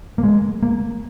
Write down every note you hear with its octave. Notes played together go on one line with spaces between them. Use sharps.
A#3
G#3
A#3